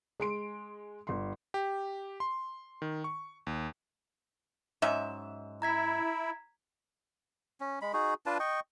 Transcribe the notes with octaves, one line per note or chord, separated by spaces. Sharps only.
G#3 C6 D7
G1 C6
G4
C6
D#3
C#6
D#2
G#2 F#3 C#4 E5
E4 A#5 G#6 B6
C#4
G#3 B5
D#4 F#4 G#4
D4 F4 B4 A5
D#5 G5 C#6